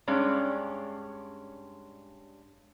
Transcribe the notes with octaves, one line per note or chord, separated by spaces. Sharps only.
G2 G#3 C#4 D5